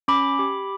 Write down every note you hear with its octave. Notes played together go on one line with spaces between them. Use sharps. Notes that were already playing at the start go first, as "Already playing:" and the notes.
C#4 B5 D6
G4